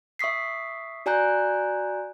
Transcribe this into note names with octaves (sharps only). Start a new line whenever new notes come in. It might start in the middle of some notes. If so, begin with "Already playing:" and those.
E5 C#6 D#6 B6 C7
F#4 D5 G#5 A#5 F#6 G6